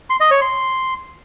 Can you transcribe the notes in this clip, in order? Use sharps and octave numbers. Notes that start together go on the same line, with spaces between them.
C6
D#5
C#5
C6